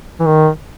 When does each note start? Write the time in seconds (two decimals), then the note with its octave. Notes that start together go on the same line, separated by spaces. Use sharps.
0.20 E3
0.26 D#3